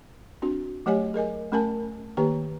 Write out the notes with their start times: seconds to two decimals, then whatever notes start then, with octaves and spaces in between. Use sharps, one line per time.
0.42 C4 D4 F#4
0.86 F#3 A3 G4 C#5 D#5 G#5
1.14 G#4 A#4 D#5 G#5
1.52 A3 C#4 A#4 G#5 A5
2.17 D#3 A#3 G4 B4 A#5